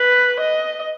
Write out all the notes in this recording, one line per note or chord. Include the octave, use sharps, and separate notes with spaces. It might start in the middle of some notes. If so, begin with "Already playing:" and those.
Already playing: B4
D#5